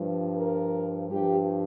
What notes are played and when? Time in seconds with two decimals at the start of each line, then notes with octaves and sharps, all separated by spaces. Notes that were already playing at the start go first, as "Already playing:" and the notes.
Already playing: G2 F3
0.37 A#4
1.10 G2 F3 G4